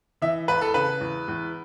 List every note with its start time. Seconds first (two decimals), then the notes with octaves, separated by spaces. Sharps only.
0.22 E3 E5
0.48 E2 B4
0.61 A4
0.74 C#3 B4
1.00 E2
1.28 E2